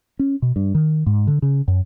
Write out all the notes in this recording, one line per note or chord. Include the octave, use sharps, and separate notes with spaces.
C#4
B2
G2
D#3
G#2
D3
C#3
F#2